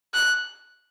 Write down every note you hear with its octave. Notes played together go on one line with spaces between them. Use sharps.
F#6